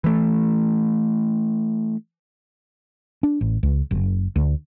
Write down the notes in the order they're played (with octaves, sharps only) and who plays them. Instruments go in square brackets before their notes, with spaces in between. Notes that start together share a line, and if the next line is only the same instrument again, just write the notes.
[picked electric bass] E3 A3
[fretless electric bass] D4
A1
C#2
F#1
D2